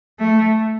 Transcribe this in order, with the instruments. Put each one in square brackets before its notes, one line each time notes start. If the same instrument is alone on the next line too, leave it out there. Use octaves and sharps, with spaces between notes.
[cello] A3